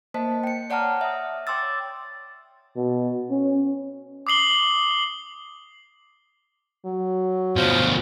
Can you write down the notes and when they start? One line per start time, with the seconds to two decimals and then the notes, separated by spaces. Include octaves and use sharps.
0.14 A#3 C5 D#5 A5 B6
0.44 G5 C#7
0.70 C#5 D5 F#5 A5 A#5 F6
1.01 E5 D#6
1.47 C#5 G5 C6 D6 E6 A6
2.76 B2
3.31 C#4
4.27 D6 D#6 C7 F#7 G7
6.85 F#3
7.57 D2 B2 F3